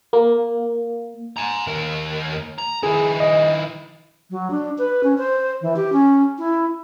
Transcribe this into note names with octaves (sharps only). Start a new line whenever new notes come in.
A#3
G#5 A#5
D#2 A#4
A#5
D#3 E4 G#4
D#5
F#3
D4
B4
C#4
C5
E3
G4
C#4
E4